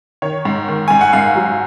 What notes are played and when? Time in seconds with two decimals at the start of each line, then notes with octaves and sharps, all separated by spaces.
0.22 D#3 C#5
0.45 G#2
0.68 D#3
0.88 G#2 G#5
1.01 F#5
1.13 G#2 F5
1.36 F#3